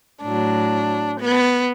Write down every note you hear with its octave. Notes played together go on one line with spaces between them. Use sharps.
A2 F#3 D4
B3